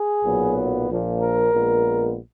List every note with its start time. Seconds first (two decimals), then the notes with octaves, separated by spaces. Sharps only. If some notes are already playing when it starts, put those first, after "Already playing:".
Already playing: G#4
0.22 B1 A#2 F#3 B3
0.87 A#1 A#2 F3
1.21 A#4
1.53 A#1 A#2 G#3 B3